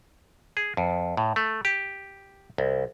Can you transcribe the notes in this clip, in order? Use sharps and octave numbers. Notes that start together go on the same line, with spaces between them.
G#4
F2
A2
A3
G4
C2